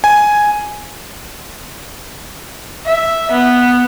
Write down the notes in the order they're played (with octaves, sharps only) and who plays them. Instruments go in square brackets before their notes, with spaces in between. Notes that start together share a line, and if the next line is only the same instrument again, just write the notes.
[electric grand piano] G#5
[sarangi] E5
B3